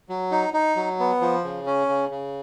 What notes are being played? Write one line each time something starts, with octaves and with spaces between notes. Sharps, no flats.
F#3
D#4
D#4
F#3
B3
F3
C#3
C#4
C#3
C#3